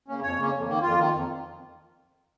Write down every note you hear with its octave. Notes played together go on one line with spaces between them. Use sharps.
C#3 A#3 C#4
F2 C#5
C#3 A#3 C#4
F2
D#3 A#3
F2 F4
D#3 A#3
F2